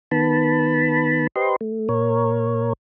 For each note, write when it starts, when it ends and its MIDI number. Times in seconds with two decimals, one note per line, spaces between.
0.11 1.27 51
0.11 1.27 59
0.11 1.27 81
0.11 1.27 83
1.36 1.56 67
1.36 1.56 71
1.36 1.56 72
1.36 1.56 75
1.36 1.56 84
1.61 1.88 57
1.89 2.73 46
1.89 2.73 70
1.89 2.73 73